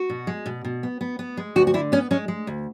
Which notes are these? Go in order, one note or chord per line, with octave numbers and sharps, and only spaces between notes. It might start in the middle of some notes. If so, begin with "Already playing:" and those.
Already playing: F#4
B2
G#3
B2
B2
B3
B3
B3
G#3
D2 F#4
F#4
D3 E4
B3 C#4
G#3 C#4
G#3
D2